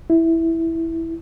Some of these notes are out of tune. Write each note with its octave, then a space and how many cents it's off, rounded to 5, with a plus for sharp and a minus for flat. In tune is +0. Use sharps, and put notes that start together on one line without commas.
E4 -5